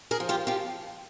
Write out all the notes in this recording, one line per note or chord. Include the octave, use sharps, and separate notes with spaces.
G#4 A#4
F3
F4 G4
F3 F4 G4